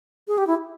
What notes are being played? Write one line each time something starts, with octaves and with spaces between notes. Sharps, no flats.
G#4
G4
E4